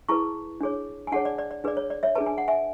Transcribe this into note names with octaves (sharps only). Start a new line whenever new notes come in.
E4 G#4 B4 A5 C#6
D4 G#4 C#5
G#5
D4 G#4 C#5 F#5 A5
D5
D5
D5
D4 G#4 B4 D5
C#5
D5
C#5 E5
D4 G#4 B4 A5
G#5
F#5
E5 G#5